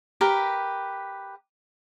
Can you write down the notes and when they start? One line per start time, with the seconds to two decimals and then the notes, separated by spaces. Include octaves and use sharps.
0.21 G4 A#4 B4 A#5